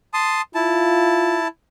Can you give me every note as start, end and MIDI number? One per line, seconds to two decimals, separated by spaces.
0.14 0.41 81
0.14 0.41 84
0.14 0.41 87
0.55 1.48 64
0.55 1.39 65
0.55 1.48 81